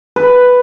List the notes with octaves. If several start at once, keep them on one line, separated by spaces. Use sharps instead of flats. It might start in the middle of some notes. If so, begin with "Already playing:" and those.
B4